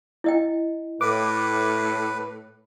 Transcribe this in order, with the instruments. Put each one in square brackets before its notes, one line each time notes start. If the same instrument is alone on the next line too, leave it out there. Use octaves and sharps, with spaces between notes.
[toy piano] E4 D#5 G5
[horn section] A2 [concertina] B4 [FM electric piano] D6